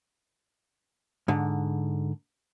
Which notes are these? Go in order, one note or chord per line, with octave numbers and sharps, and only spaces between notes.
G#2 D3